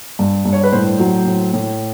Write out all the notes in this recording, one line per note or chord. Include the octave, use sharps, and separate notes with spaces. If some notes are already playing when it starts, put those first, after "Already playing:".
G2
G2
C#5
B4
A2 C5
F#3
A2
A2